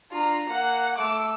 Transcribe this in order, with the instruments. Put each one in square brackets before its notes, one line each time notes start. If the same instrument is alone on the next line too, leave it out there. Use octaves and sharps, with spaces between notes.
[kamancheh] D4 A#5 [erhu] F4
[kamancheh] A#3 [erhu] F#5
[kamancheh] A3 E6 [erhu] D6